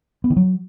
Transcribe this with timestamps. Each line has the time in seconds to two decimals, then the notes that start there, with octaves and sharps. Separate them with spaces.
0.24 B3
0.30 D#3
0.37 F#3